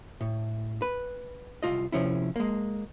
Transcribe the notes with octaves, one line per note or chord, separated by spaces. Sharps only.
A2
B4
C2 F4 D#5
C3 F3 C#4 E4
G#3 A#3